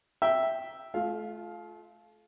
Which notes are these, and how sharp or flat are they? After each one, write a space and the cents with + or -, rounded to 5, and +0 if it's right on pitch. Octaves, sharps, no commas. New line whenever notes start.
E5 +0 G5 +0
A3 -40 F4 +0 F5 +10